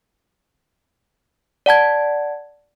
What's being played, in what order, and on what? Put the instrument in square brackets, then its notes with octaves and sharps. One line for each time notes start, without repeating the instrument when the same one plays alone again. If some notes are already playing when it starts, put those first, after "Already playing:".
[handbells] D5 F#5 A5 G#6